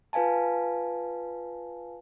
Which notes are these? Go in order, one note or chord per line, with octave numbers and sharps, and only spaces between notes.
F4 B4 F5 G#5 A5